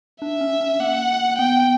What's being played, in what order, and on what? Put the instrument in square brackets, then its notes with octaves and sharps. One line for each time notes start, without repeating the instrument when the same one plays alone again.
[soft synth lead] D4 [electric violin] E5
[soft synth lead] C#4
C#4
[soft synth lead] A#3 [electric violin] F#5
[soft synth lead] B3 [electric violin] G5